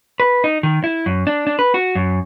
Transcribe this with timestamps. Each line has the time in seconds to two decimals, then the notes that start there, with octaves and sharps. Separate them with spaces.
0.20 B4
0.44 D#4
0.63 D#3
0.84 E4
1.06 F#2
1.27 D4
1.47 D4
1.59 B4
1.74 F#4
1.95 F#2